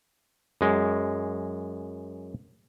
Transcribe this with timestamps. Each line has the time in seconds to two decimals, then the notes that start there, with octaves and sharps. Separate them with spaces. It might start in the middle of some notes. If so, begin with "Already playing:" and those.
0.61 F#2 G#3